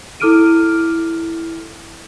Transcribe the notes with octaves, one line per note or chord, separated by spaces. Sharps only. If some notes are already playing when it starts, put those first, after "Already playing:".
E4 A4 D6 F6 D7 D#7